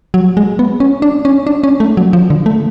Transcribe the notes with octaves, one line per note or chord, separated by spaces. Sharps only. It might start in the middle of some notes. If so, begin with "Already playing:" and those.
F#3
G#3
B3
C#4
D4
C#4
D4
C#4
A3
F#3
F3
D3
A3